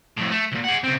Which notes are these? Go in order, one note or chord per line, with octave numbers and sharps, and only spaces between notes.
F2 A2
A3
C2 A#2
G#4 F#5
C#3 C4